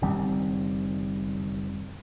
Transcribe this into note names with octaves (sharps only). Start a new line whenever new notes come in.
F#1 D#3 G3 C4